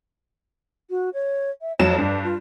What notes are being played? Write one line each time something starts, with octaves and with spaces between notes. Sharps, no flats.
F#4
C#5
E5
F2 F#3 C#5 E7
G2 D4
F4